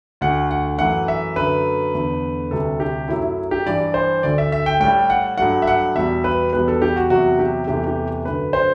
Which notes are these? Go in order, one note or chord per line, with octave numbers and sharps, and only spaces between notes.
D2 D3 A3 F#5
F#5
F#2 E3 A3 F#5
E5
F#2 D3 A3 B4
E2 D3 A3
D2 C3 G3 A4
G4
F#2 F#3 A3 E4
E4
G4
G2 E3 G3 D5
C5
D2 D3 A3 D5
E5
E5
G5
A2 G3 G5
F#5
G2 F#3 A3 F#5
E5
F#5
E2 B2 G3 E5
B4
E2 B2 G3 B4
A4
G4
F#4
E2 C3 F#3 F#4
G4
E2 C3 E3 A3 G4
G4
F#2 D3 A3 B4
C5